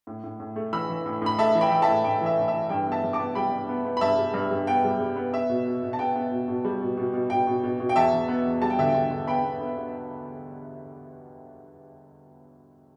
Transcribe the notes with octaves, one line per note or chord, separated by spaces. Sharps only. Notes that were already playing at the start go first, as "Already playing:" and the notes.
A2
A2
A2
A3
E3 B5 E6
E3
A2
A2 B5
A3 E5 A5
E3
G5 B5
E3 G5
E5 A5
A2
A2 G5
E3 E5
A2
E5
E3
G2 G5
B3
E5 A5
G2
A5 D6
B3
G3 G5 B5
G2
B3
B3
B5
G2 E5 A5
G3
G2
G2
B3 G5
G3
G3
B3
B3 E5
B2
B2
B2
A5
B3 G5
B3
B2
B2
G3
B2
B2
B2
B2 G5
B2
B2
B2
G5
E2 E5 A5
E2
B3
E2
G3 A5
G5
D3 E5
G5
D3
D3
B3 G5 B5
B3
B3
B3